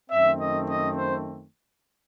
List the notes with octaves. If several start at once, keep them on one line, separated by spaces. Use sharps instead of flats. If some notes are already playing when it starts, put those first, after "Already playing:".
F#2 D#3 A3 C4 E5
D#5
D#5
C5